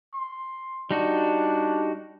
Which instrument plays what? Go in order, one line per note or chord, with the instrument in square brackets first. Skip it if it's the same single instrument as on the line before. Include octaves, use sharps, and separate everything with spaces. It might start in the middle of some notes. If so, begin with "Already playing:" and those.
[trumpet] C6
[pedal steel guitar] G3 D#4 F#4 [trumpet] D4